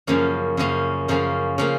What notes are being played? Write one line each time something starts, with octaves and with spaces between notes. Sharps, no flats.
F#2 C#3 F3 A#3 C#4
F#2 C#3 F3 A#3 C#4
F#2 C#3 F3 A#3 C#4
C#3 F3 A#3 C#4